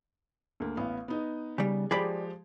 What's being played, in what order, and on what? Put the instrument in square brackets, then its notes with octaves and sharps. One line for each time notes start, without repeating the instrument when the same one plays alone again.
[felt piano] D2 A#3
A1 B3 F5
B3 D#4 D#5
[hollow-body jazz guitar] C#3 G3
[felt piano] F3 G#3 G4 [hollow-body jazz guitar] G#4 D5 B5